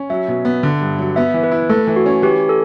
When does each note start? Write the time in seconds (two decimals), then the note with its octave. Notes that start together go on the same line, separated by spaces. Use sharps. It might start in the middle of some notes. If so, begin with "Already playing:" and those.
Already playing: C#4
0.10 F#3 E5
0.28 B2
0.45 B3
0.63 D3
0.81 G2
0.98 F#3
1.16 B3 E5
1.34 E3
1.44 B4
1.51 E4
1.69 A3 A4
1.87 E3
1.96 F#4
2.06 C#4
2.22 E3 G4
2.49 A4